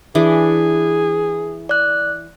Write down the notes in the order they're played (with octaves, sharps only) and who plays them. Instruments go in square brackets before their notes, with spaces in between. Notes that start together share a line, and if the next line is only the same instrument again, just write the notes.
[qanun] E3 D4 [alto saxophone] G#4
[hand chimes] D5 F#6